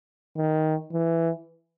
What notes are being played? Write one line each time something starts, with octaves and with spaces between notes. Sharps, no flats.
D#3
E3